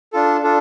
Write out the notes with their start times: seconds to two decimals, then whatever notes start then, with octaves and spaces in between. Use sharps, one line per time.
0.13 D4 F4 A4
0.43 D4 F4 A4